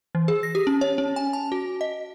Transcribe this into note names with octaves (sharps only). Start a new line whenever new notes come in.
E3
G#4
A#6
G4
C#4
C#5
C#4
G#5
A5
F#4
D#5